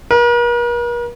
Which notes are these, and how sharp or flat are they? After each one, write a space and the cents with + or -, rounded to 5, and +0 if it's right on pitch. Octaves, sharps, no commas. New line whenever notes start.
A#4 +45